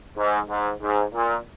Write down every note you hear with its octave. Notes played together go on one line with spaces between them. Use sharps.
G#2
G#2
G#2
A#2